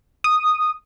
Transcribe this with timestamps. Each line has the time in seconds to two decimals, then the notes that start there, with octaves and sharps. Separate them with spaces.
0.24 D#6